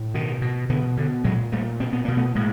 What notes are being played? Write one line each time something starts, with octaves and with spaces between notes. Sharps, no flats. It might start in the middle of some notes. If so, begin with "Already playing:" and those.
Already playing: A2
B2 D#3
B2
B2 D3 E3
B2 D3
A#2 F#3 G#3
A#2 G3 A3
B2 C4
B3
B2 A#3
A3 B3
A2 G#3 A#3